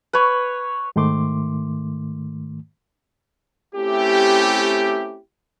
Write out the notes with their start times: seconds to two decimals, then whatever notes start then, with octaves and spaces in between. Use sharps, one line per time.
0.13 B4 C#5
0.96 G#2 D#3 A3 C6 D6
3.75 A3 C4 C#4 E4 G4